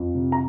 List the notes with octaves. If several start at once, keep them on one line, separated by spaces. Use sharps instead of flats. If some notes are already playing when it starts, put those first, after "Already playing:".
Already playing: F2
C3
A#5